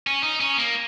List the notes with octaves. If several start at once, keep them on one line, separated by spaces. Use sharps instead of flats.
C#4
D#4
C#4
A#3